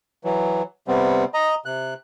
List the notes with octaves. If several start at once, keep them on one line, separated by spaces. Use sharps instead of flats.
E3 F#3
C3 G3 B3 C4
D#5 A#5
C3 F#6